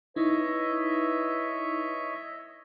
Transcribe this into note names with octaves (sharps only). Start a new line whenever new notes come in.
D#4 E4 B4 C#5 D#5 E5